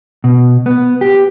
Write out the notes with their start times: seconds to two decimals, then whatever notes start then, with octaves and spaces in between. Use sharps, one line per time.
0.24 B2
0.66 B3
1.01 G4